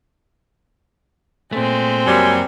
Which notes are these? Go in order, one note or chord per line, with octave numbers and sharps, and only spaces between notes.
A#2 G#3 A3 C4
F#2 C3 F#3 G3 A#3 G#5